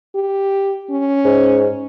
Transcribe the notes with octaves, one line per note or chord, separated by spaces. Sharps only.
G4
C#4
G#2